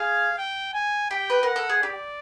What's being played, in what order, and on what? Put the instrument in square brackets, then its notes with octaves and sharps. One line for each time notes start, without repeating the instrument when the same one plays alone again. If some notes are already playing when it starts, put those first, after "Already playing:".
Already playing: [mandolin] G#4 [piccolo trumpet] F5
[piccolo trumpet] G5
G#5
[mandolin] G4 [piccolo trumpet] G5
[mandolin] B4
[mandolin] A#4 [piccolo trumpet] F#5
[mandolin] A4
G#4
[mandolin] G4 [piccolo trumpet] D5